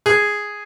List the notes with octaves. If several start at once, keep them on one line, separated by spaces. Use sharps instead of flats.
G#4